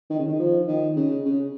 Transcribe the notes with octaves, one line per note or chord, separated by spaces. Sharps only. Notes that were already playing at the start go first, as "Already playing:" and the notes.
D#3
C#3
D#3
F3
D#3
C#3
C#3